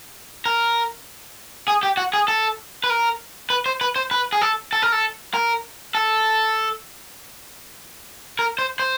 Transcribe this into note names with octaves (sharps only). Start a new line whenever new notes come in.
A#4
G#4
G4
F#4
G#4
A4
B4
A#4
B4
C5
B4
C5
B4
G#4
A4
A4
A#4
A4
A#4
A4
A#4
C5
C5